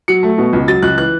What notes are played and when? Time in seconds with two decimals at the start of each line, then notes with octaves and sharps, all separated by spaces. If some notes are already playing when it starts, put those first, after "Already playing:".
0.08 F#3 C#7
0.23 A3
0.38 B2
0.53 C#2
0.68 F#3 A6
0.82 C#2 F#6
0.98 E3 F#6